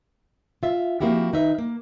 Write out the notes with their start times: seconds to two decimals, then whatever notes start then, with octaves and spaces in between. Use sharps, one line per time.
0.63 F4 E5
1.01 F3 A#3 C4 E4 F#4 G4
1.33 D#3 D#4 B4 E5
1.58 A#3